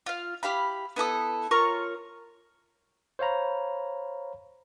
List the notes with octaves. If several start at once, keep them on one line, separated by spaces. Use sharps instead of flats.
F4 F5
E4 G4 F5 B5
B3 E4 A4 D#6
F4 A#4 C#5 C#6
C5 C#5 F5 A#5 B5